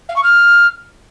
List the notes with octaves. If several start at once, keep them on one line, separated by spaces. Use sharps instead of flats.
F5
C#6
F6